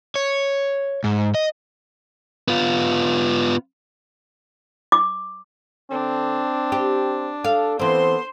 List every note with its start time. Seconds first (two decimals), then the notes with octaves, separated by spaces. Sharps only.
0.16 C#5
1.04 G#2
1.35 D#5
2.48 B3 F4
4.92 D6
5.91 D3 C4 D4
6.72 G4 C5
7.44 A4 F5
7.79 E3 B3 C4 A4 C5 C6